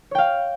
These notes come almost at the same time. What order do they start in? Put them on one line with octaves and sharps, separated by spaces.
C#5 G5 F5